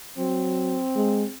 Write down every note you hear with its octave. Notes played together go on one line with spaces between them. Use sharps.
F#3 C4
G#3